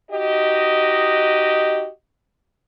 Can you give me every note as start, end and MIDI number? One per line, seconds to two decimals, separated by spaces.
0.11 1.88 63
0.11 1.88 66
0.11 1.88 67
0.11 1.88 75